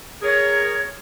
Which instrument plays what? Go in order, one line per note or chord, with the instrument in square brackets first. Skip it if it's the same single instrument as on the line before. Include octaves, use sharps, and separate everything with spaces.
[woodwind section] G#4 A#4 C#5